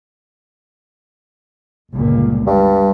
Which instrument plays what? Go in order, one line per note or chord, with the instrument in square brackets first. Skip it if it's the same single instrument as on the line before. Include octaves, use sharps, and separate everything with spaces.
[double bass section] G1 C#2 A#2
[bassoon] G2 [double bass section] G3